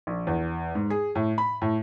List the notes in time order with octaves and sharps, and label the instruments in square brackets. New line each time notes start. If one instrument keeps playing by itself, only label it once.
[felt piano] A#1
E2
G#2
G#4
A2
B5
A2